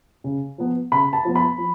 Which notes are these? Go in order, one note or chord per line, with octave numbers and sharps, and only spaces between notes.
C#3
F3 B3
C#3 B5
A5
F3 B3
B5
F3